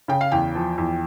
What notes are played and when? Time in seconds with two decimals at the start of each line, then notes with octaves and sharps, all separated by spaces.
0.08 C#3 G5
0.21 F5
0.32 E2 G5
0.55 F3
0.78 E2